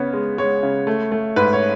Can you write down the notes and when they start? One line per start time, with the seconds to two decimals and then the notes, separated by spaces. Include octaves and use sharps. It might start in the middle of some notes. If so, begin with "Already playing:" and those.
Already playing: C#3 B3 C#5
0.13 G#3
0.38 G#3 C#5
0.63 C#3
0.87 A3
1.12 A3
1.36 G#2 B4
1.53 C#5